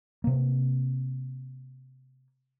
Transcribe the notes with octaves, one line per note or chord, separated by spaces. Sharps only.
C3 A#3